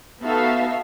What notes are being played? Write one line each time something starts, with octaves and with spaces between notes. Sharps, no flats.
B3 D#4 F#4 A4 E5 F5